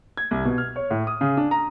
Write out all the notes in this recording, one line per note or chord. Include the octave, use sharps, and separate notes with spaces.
G#6
C2
B2
F6
C#5
A2
D#6
C#3
D4
A#5